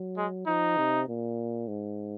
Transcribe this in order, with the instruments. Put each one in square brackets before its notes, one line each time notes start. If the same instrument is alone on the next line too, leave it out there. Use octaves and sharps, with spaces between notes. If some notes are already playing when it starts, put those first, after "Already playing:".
Already playing: [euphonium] F#3
[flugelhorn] G#3
[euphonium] F3 [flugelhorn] D#4
[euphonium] C3
A#2
G#2